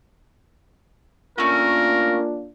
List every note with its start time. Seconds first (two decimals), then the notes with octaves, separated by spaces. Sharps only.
1.38 A3 A#3 C#4 D4 F4 A#4